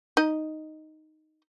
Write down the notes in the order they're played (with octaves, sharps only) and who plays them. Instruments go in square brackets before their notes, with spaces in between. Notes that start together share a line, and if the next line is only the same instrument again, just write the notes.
[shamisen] D#4 D#5